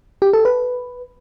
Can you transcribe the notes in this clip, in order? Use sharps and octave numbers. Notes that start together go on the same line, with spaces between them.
G4
A4
B4